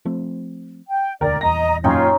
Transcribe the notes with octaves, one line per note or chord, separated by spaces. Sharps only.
F3 A3 C4
G5
E1 D2 A#4 D5 G5 A#5
D#1 E2 D#5 A#5 A#6
F#2 A#2 C#4 D#4 F4 C#5 G5